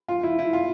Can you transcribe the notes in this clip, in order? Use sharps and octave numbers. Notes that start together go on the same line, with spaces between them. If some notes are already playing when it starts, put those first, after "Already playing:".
F4
E4
E4
F4